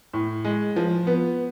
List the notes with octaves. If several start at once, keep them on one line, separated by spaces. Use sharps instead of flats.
A2
G#3
F3
B3